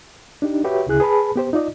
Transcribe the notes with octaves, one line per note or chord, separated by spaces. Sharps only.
D4 D#4 G4
F#4 G4 B4 C#5 E5
D2 C#3 E4 G#4 F#6
G#4 B4 A5 B5
B3 G4 C5
D#4 F4 D5 D#5